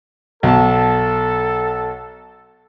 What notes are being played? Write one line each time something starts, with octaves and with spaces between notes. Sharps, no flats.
B1 A4 A5